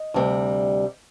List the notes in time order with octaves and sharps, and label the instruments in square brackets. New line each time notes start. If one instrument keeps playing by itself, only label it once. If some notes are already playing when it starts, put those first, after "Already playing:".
Already playing: [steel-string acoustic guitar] D#5
D2 C3 G3